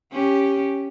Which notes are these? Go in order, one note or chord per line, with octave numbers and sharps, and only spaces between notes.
C#4 G4